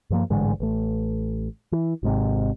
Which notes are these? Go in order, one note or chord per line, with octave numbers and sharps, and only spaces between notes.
G2 F3 A#3
A1 G#2 D3 G#3
A1 A3
E3
G#1 G#2 C3